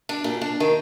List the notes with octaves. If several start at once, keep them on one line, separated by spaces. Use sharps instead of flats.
D4
A#2
D4
D#3